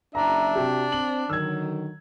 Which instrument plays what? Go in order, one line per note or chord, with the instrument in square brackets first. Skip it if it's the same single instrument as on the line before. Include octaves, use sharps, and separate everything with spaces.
[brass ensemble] F#1 E5 [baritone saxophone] D4 [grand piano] A#5
[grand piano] C3 F#4 G4
[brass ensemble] C4 [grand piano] F#7
[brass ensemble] D3 D#3 F#3 [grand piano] E6 G#6